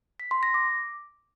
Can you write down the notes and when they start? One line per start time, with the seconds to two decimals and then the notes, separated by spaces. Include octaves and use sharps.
0.20 B6
0.31 C6
0.43 A#6
0.54 D6